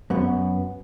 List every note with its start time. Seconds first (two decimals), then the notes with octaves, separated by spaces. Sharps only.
0.10 F#2 B3